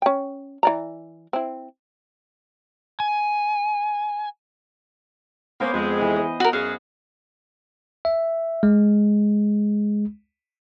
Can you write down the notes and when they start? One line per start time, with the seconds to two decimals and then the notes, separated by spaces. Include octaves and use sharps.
0.02 C#4 G5
0.63 E3 D5 A#5
1.33 C4 E4
3.00 G#5
5.60 A#3 B3 C#4 C5
5.73 F2 G#3
6.01 E3
6.16 D#5
6.40 F#4 A#4
6.53 F#2 F#4 G#4 F5
8.05 E5
8.63 G#3